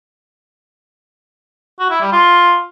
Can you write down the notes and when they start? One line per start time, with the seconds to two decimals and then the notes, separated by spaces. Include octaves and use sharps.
1.79 F#4
1.90 E4
2.01 G3
2.12 F4